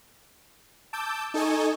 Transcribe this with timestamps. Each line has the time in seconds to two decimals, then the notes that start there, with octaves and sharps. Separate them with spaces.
0.93 A5 D6 E6 G6
1.34 D#4 A4 D#5 G#5 C#6